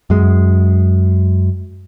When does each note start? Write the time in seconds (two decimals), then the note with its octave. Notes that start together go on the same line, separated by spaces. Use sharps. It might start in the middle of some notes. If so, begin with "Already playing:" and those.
0.10 F#2 G#3